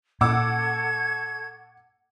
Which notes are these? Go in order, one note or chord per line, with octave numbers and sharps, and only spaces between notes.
A#2 A4 F#5 C#6 D6 E6 G#6